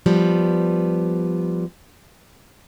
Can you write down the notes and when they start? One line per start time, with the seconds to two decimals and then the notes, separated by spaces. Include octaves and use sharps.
0.06 F3 G3 B3